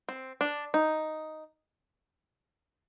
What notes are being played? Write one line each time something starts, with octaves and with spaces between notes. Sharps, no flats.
C4
D4
D#4